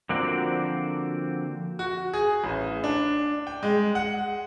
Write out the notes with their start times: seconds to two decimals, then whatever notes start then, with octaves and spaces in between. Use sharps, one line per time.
0.09 D3 F3 A#3 C4 F#4 D5
1.79 F#4
2.13 G#4
2.44 A1
2.84 D4
3.47 G5
3.63 G#3
3.95 F#5